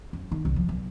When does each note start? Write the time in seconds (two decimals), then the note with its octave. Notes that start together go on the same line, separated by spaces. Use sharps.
0.13 F#2
0.32 D#3
0.45 C2
0.56 F3
0.69 B1